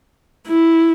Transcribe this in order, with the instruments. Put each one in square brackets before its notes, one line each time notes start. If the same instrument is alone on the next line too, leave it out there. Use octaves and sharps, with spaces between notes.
[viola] E4